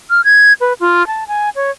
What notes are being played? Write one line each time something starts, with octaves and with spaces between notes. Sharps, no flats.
F6
G#6
B4
F4
A5
G#5
C#5